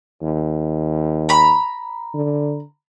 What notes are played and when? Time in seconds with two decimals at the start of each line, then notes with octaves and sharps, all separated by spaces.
0.22 D#2
1.29 A#5 B5
2.14 D3